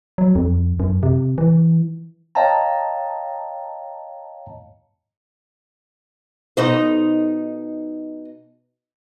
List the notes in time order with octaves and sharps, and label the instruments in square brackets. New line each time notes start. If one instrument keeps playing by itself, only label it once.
[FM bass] F#3
F2
F#2
C3
E3
[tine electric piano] C#5 D#5 F5 G5 A5 A#5
[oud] B2 D#4 C5